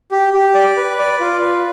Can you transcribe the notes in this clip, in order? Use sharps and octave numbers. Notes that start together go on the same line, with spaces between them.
G4
G4
D5
B4
D5
F4
B4